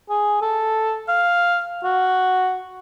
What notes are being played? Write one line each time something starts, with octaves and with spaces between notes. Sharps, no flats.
G#4
A4
F5
F#4